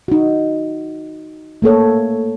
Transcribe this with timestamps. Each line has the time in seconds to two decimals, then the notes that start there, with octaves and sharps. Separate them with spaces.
0.08 D#4 F#4
1.62 A3 A#3 A4 C#5